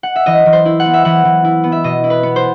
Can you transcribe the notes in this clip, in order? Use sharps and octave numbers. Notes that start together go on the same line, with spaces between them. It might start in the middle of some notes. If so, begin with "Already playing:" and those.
F#5
E5
E3 D#5
E3
C5
E4
F#5
B3
E5
E3 F#5
E3
E4
B3
E5
B2 D#5
E4
B4
B3
C5